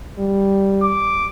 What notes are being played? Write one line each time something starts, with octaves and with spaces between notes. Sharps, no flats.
G3
D6